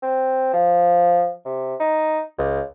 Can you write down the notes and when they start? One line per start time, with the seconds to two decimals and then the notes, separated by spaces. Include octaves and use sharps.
0.02 C4
0.53 F3
1.45 C3
1.80 D#4
2.38 C#2